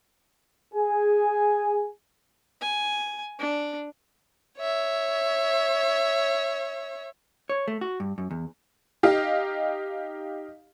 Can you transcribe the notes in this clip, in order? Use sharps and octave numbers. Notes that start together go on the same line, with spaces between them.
G#4 G#5
G#5
D4
C#5 E5
C#5
A3
F#4
G2
F#2
E2
D#4 G4 D#5 F5